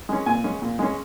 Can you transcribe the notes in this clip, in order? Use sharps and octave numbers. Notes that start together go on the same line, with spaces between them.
G#3 C#4
A#2 G#5
G#3 C#4
A#2
G#3 C#4